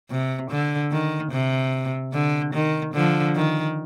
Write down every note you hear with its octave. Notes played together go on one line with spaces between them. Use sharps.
C3
D3
D#3
C3
D3
D#3
D3 F3
D#3